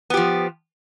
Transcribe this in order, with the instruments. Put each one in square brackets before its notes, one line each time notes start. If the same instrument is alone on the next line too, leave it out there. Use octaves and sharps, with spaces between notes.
[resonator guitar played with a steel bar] B3
G4
F3